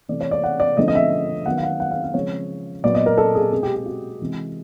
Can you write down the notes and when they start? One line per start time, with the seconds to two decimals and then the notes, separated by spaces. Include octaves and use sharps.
0.09 C3 E3 A3 D5
0.21 C#5
0.31 D5
0.44 F#5
0.60 D5
0.77 D3 F3 A3 C4 D#5
0.88 D#5
0.95 E5
1.46 D#3 F#3 B3 F#5
1.57 F5
1.63 F#5
1.80 F#5
1.91 F5
2.04 F5
2.14 C#3 F3 G#3 C4 C#5
2.83 A#2 F#3 B3 D5
2.95 D#5
3.06 A#4
3.17 A4
3.35 G#4
3.52 B2 G#3 C4 G#4
3.63 G4
3.75 G4
3.86 F#4
4.21 C3 E3 G#3